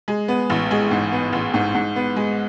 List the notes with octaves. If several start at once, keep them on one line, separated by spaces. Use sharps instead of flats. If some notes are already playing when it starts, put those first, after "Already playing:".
G#3
B3
A1
G#3
G#2
B3
A1
G#2
G#2
B3
G#3